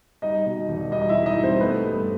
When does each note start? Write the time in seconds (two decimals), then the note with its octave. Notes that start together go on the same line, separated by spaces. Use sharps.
0.22 G3 D#4 D#5
0.46 B2
0.68 E1
0.91 G3 D#4 D#5
1.02 D#5
1.09 E4 E5
1.14 E1
1.26 D#4 D#5
1.38 G3
1.44 C4 C5
1.60 A3 B3 B4
1.84 G2